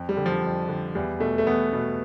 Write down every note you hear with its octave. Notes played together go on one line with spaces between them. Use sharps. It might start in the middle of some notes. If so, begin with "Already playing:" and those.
Already playing: F2
G3
D3
F3
F2
D3
E2 G3
B2 A3
A3
E2 B3
B2